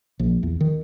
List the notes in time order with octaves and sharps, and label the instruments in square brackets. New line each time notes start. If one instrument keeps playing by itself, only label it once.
[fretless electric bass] A#1
E2
D#3